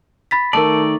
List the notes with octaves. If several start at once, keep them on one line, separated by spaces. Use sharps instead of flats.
B5 A6 B6
D#3 A3 A#4 D5 A5